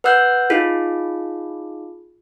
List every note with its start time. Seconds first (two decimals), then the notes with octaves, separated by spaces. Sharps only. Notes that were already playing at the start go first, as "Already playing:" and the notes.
0.04 B4 F#5 E6 F#6 G6
0.50 D#4 F4 G#4